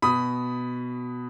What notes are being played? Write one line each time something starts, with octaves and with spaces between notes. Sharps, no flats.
B2 B5 D#6